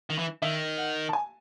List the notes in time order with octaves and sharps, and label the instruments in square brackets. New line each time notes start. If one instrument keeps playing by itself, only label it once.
[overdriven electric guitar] D#3
E3
[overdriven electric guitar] D#3 [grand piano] E5
[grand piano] F#5
A5
G#5